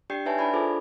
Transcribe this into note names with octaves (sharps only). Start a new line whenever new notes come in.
D4 G4 D5 G5 G6 C7
D#4 B4 C#5 E5 G#5 A5
D4 E4 D5 A5 B5 G#6
F4 G#4 A4 C5 D6